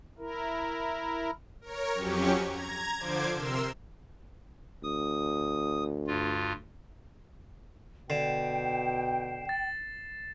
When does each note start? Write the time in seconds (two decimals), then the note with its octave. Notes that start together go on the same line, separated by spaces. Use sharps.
0.18 E4 A#4
1.61 A#4 C#5
1.95 F2 F#3 C#4 G4 C#6
2.48 A#5 G#6
2.97 D3 F3 C5 D6 G#6
3.35 C3 A#4 C6 E6 E7
4.83 D2 D#6
6.07 G2 F4
8.10 B2 D3 G5 C7 E7
9.49 A6